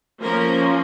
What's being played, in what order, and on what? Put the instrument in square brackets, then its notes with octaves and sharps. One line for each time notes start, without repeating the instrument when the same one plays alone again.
[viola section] F3 A#3 C#4 A#4